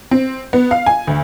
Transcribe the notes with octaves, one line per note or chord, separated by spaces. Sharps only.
C4
B3
F5
G#5
D2